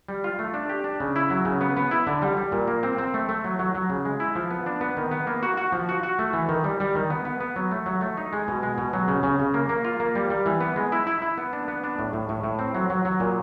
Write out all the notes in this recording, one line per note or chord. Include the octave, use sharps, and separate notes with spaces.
G3
F4
A3
D4
G4
D4
C#3
E4
F#3
C#3
B3
B3
E4
D3
G3
G3
A#2
A#3
C4
C4
A3
A3
F#3
F#3
F#3
C#3
G#3
E4
F3
B3
D4
B3
D#3
B3
A#3
F#4
F#4
F3
F#4
F#4
A3
E3
D#3
G3
G3
D#3
B3
B3
B3
F#3
A3
F#3
A3
D#4
G#3
B2
G#3
B2
F#3
C#3
C#3
C#3
A#3
A#3
F4
A#3
G3
G3
E3
B3
G#3
E4
E4
E4
B3
D4
B3
D4
A2
A2
A2
A2
C4
F#3
F#3
F#3
A#2